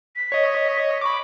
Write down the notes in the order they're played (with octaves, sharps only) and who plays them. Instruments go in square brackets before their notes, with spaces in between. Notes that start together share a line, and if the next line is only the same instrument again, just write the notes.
[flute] B6
[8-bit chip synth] C#5 D#5
[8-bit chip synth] B5 D6 [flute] C#6